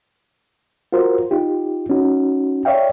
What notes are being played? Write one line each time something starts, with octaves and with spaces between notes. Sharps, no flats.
F4 F#4 A#4 C5
D#4 F4 G4
C#4 D#4 F#4
C#5 D5 E5 F5 G5